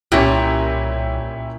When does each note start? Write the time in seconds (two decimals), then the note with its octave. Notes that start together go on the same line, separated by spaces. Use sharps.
0.12 C2 A#2 C#4 E4 G4